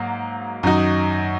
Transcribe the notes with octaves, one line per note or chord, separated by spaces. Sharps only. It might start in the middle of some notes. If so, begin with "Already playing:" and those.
Already playing: G#2 F#3 A#3
F#2 D#3 F#3 D#4 F#4